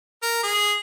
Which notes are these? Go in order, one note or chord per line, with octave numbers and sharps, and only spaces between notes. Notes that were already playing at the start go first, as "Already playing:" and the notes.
A#4
G#4